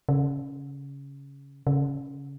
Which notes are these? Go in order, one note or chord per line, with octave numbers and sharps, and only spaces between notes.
C#3
C#3